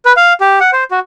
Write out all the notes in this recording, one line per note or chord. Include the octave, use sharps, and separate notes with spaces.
B4
F5
G4
F#5
C5
F#4